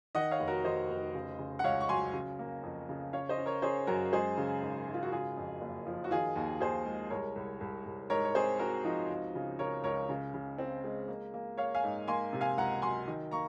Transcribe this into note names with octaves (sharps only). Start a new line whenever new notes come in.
D#3 D#5 F#5
C#5 F5
F1
F#4 A#4
D#3 C5 D#5
F1
C#3
C#3
F#5
C#2 C#5 F5
C#6
F#3 G#5 C6
C#3
A#3
F2
C#3
C#4 C#5 F5
C5 D#5
C#4
A#4 C#5
C#4 G#4 C5
F#2 F#4 A#4
G#3 G#4 C5
C#3
G#1
G#1
F4
F#4
C#3 F4 G#4
F2
F#1
F3
F#4
D#3 F4 G#4
D#2
D#2 G#4 C5
G#3
C2 A#4 C#5
C2
C2
C2
G#2 A#4 C#5
C#5
C4 G#4 C5
C4 F#4 A#4
F3 D#4 F#4
C#2
C#3
C#3 A#4 C#5
C#2 A#4 C#5
C#3
C#3
C4
G#3
A#3
A#3
A#3 C#5 F5
F5 G#5
G#2
A#3 G#5 C6
C3
F5 G#5
C#2 F#5 A#5
F#3 G#5 C6
D#3
A#3 A#5 C#6